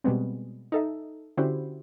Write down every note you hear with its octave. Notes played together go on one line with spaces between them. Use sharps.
B2 G3 G#3 B3 C4
D#4 A4 E5
D3 C#4 E4 F#4 G4 C5